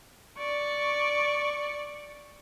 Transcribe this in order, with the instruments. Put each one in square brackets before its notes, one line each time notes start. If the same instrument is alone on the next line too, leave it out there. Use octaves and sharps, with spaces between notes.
[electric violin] D5 C#6